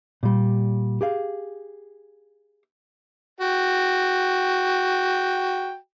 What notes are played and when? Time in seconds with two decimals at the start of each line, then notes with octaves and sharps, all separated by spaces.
0.23 A#2 G3
1.01 G4 G#4 F5
3.41 F#4 G5